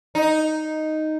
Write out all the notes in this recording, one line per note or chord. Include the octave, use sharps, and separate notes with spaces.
D#4